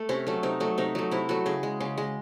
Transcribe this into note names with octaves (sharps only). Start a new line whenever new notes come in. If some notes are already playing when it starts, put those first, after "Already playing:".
Already playing: A3
C3 C#4
F#3 A3
C3 D#4
F#3 A3
C3 D#4
F#3 A3
C3 E4
F#3 A3 F#4
C#3 G#4
G#3
C#3
G#3